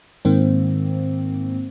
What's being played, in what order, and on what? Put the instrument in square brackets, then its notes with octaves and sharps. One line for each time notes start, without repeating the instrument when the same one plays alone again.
[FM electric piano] G#2 D#3 A#3 C4